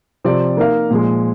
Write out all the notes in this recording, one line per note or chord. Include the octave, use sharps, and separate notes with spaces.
C3 F3 C4 G4 D5
A#3 D#4 A#4 F5
A#2 F3 G#3